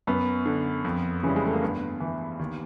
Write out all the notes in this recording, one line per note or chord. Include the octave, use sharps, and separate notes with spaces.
F#2 B3
D3
F2
C#3 E3 G3
G#3
A3
A#3
G2 B3
E3
D#2